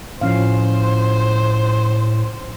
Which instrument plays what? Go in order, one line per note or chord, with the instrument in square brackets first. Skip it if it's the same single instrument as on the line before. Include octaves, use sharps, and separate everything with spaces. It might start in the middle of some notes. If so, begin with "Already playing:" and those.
[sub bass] A2 [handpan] F3 C#4 F5 [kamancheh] C5